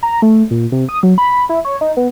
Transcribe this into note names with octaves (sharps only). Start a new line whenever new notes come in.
A#5
A3
A#2
C3
D#6
F#3
B5
E4
C#5
D#4
B3